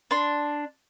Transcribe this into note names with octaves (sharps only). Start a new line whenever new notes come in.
D4 C6